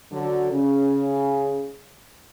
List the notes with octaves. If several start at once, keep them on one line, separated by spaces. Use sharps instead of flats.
D3 F#3
C#3